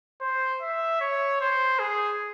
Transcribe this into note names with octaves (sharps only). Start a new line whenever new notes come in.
C5
E5
C#5
C5
G#4